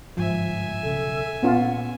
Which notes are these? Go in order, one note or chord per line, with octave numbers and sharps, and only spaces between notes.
G1 G#2 F3 E5 G#5
B1 C#3 A4
A#2 B3 C#4 F4 F#5